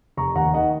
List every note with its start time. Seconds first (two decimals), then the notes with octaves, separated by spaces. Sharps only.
0.17 F1 A#5 C#6
0.35 D#2 F#5 A#5
0.54 D#3 D#5 F#5